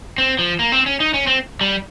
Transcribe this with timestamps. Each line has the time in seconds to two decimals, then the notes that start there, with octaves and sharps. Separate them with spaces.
0.18 C4
0.39 F3
0.59 A#3
0.72 C4
0.86 C#4
1.00 D#4
1.14 C#4
1.27 C4
1.61 G3